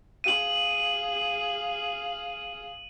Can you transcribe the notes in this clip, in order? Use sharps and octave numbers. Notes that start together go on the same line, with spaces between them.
G#4 F5 D#7 F#7